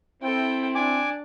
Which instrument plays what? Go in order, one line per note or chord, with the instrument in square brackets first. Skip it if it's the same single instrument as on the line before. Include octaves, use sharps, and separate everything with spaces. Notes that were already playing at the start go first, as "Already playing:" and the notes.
[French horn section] C4 E4 [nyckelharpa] A4 G5
[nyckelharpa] D4 [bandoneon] G#5 D6